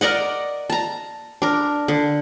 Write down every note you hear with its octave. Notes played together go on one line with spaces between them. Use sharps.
A#4 D5 D#5 F#5
A5 A#5
D4 A#4
D3